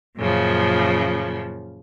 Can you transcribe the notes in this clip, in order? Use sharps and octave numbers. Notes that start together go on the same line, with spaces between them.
F#2 A#2 C#3 F3